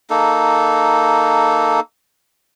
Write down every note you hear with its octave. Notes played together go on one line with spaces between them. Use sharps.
A#3 D#4 A4